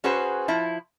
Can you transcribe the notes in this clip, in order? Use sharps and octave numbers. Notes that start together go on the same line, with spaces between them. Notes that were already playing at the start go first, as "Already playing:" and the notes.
C#4 F#4 G#4 B4 C5
F3 E4